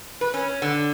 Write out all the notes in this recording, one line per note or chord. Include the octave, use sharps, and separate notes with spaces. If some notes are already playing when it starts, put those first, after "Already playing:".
B4
C#4
D3